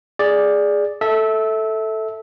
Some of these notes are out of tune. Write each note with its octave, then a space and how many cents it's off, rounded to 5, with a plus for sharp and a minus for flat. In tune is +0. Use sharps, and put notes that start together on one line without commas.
G#4 +0 D5 +0
A4 +0 E5 -20